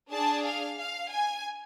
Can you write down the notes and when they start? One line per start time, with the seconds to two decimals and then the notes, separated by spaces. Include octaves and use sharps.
0.11 D4 G#4 A5
0.45 F5
0.78 F5
1.11 G#5